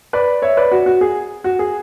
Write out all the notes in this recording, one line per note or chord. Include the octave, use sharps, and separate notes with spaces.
B4 D5
C#5 E5
B4 D5
F#4
F#4
G#4
F#4
G#4